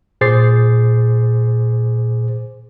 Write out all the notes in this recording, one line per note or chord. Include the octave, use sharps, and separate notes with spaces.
A#2 G#4 C5 D6 A6 C7